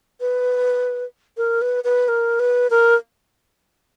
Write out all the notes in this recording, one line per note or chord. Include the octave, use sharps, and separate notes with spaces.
B4
A#4
B4
B4
A#4
B4
A#4